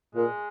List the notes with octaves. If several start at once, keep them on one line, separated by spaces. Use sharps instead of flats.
A#2 G#3